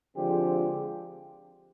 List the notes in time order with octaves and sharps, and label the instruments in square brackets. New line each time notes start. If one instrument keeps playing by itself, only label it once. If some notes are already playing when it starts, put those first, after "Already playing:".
[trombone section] D3 F3 G#3 C4 G4